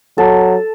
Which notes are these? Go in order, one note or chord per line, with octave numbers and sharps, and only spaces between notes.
F#3 A4